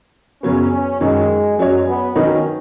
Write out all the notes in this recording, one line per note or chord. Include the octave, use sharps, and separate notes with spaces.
F#2 C#3 F#3 B3 C#4
C#4
F#2 D#3 F#3 G#3
F#2 F#3 G#3 C#4 F#4 C#5
B3
D#3 F#3 C#4 D#4 B4